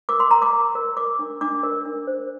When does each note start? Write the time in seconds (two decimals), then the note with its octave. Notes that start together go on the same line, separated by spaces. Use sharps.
0.09 A#4 D6
0.20 C6
0.31 A#4 A#5
0.42 D6
0.53 A#4
0.75 A#4
0.97 A#4 D6
1.19 D4
1.41 D4 D6
1.63 A#4
1.85 D4
2.07 C5